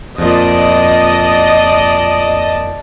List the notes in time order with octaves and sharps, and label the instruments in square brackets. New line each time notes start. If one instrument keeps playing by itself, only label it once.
[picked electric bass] F2 A#2 [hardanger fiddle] D5 A5 [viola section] D#5